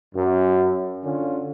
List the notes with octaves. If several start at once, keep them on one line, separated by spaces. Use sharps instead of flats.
F#2
D3 C#4 F4